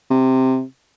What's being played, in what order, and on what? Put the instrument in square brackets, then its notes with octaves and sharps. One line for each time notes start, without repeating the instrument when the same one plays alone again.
[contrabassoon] C3